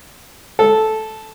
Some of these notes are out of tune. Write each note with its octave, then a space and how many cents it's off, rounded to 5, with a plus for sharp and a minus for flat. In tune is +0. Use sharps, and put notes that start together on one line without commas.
A4 -10